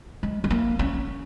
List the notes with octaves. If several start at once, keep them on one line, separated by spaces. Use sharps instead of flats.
G#3
G#3
A#3
C#4